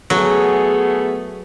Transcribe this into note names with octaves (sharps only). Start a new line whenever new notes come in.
F#3 A3 B3 G#4